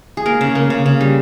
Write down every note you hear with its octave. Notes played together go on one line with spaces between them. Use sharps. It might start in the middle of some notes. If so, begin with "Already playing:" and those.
G#4
A#3 A#4
C#3
A#3
C#3
C#3
G3